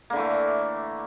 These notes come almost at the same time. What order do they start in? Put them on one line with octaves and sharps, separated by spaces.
A#3 D3 E3 A3